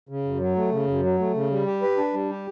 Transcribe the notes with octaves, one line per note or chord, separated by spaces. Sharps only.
C#3
F#2
F#3
A3
C#3
F#2
F#3
A3
C#3
G3
G4
B4
D4
G3
G4